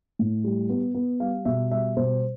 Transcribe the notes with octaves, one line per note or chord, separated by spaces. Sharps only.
A2
G3
B3
B3
G3 F5
B2 E5
G3 E5
B2 C5